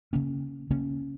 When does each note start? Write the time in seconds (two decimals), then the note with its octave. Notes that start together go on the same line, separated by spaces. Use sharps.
0.13 C#3 A#3 C#4
0.70 C#3 A#3 C#4